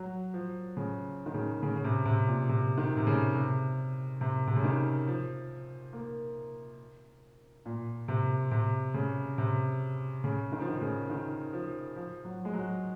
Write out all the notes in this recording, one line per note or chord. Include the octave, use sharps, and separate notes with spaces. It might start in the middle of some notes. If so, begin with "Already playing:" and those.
Already playing: F#3
F3
C#3
D#3
C#3
C#3
C#3
C3
C3
A#2
C3
D#3
C3
C#3
C3
C3
C3
C#3
D#3
F3
A#3
A#2
C3
C3
C#3
C3
C#3
D#3
F3
D#3
C#3
D#3
F3
F3
F#3
G#3
F#3